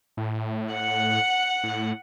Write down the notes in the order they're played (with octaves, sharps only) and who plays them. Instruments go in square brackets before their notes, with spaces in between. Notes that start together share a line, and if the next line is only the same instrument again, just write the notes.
[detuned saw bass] A2
[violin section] F#5
[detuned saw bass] A2